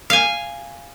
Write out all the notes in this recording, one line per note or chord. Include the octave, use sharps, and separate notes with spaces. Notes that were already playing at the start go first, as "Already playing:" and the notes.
F5 G#5